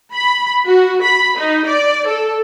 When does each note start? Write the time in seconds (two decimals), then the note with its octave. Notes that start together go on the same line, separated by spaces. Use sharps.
0.13 B5
0.66 F#4
1.03 B5
1.38 D#4
1.67 D5
2.08 A4